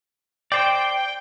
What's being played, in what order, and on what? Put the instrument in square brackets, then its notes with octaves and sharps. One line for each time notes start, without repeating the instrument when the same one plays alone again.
[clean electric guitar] C5 D5 [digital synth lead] G5